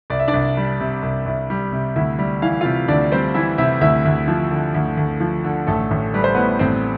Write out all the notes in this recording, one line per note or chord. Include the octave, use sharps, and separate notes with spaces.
C2 D5
E5
D4 D5
C2
G3
C3
C2
C2
G3
C3
D2 E4 E5
G3
E3 F5
F4 F5
C3
D2 D4 D5
G3 C4 C5
E3 E4 E5
C3 E4 E5
D2 E4 E5
D2
F3
D3
D2
D2
F3
D3
A1 A3 A4
A1
G3 B4
C5
A2 B3 B4
A1 C4 C5